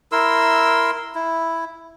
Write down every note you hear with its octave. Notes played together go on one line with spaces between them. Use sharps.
E4 A#4 C6 E6
E4